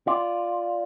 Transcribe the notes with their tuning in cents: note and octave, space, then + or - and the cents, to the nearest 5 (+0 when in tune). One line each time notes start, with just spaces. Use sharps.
F4 +0 D5 +0